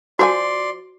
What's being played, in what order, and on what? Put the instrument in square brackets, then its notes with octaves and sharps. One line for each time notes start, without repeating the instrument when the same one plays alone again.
[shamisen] F3 C#5 G#5 [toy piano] F#4 [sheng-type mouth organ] D5 C6